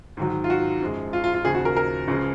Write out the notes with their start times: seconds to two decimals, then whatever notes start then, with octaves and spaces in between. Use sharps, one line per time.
0.17 G#2 D#3 F#3
0.44 F4
0.50 F#4
0.81 F#2 F3 G#3
1.13 F4
1.24 F4
1.34 F4
1.44 D#2 C#3 F3 G#4
1.55 F#4
1.65 A#4
1.77 A#4
2.08 C#2 C#3 F3 G#3